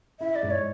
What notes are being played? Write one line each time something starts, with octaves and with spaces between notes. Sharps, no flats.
E4 E5
D5
G#2
C#5